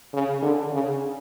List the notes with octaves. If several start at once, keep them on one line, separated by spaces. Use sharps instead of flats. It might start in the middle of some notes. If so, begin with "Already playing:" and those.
C#3
D3
C#3